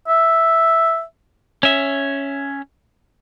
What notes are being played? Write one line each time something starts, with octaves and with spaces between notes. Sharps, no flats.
E5
C#4 E5